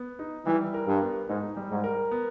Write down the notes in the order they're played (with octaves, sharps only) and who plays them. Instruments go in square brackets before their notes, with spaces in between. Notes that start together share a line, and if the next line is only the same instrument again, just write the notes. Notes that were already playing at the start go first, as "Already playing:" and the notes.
Already playing: [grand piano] B3
D#4
[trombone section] E3 [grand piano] G3
[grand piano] A#4
[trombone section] G2
[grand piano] B3
[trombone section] G#2 [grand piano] D#4
[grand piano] G3
[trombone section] G#2
[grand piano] A#4
B3